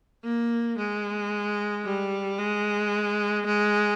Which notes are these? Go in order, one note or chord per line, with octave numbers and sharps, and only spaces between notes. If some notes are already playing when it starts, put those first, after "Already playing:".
A#3
G#3
G3
G#3
G#3